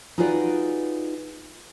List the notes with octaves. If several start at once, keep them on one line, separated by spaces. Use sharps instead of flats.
D#4 F4 F#4 G#4 B4 D5